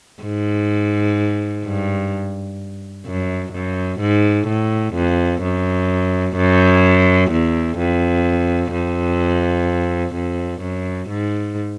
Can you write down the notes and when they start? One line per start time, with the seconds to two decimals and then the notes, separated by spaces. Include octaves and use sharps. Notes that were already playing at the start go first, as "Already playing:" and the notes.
0.22 G#2
1.64 G2
3.07 F#2
3.53 F#2
4.00 G#2
4.47 A2
4.94 F2
5.43 F#2
6.36 F#2
7.31 E2
7.78 F2
8.73 F2
10.15 F2
10.62 F#2
11.09 G#2